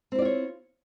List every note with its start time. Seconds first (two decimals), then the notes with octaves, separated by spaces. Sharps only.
0.12 C4
0.15 E4
0.19 D5
0.22 F4
0.25 C#5